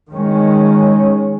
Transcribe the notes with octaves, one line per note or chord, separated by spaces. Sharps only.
D#3 G#3 C#4